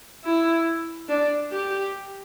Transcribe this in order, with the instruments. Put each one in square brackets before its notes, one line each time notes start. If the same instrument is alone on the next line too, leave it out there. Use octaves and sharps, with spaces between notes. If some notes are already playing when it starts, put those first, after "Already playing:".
[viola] E4
D4
G4